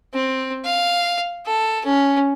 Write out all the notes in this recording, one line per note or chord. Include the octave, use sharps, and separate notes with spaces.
C4
F5
A4
C#4